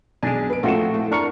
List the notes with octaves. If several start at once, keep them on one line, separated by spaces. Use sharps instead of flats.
B1 G#3 D4 G#5
B4 D7
A#1 F3 A3 C4 F4 F#4 A4 F#5
A3 E4
D4 A#4 A#5 C#6 F6 C#7